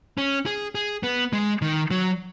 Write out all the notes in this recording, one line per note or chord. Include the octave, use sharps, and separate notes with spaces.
C#4
G#4
G#4
B3
G#3
D#3
F#3